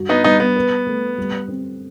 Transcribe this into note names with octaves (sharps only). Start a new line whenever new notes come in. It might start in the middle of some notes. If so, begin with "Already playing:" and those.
Already playing: G2 F#4
B3 D#4
G3 B3 D#4
B3
B4
A3
G3
C4